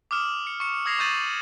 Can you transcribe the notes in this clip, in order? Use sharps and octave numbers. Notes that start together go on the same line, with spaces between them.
D6 D#6 F6 E7
C#7
C#6 C#7
D#6 G#6 A#6 C7 F7
C#6 D#6 G6 A6 D#7 F#7